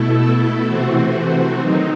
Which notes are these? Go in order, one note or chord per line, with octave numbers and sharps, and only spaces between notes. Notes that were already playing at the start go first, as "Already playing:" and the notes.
Already playing: B2 A3 E4 A4
C3 E3 A3 C4 F#4
D#3 F#3 C4 D#4